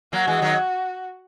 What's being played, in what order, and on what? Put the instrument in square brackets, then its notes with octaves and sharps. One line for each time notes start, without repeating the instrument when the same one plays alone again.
[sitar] F#3 A#3 [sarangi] F#4
[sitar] E3 G#3
D#3 F#3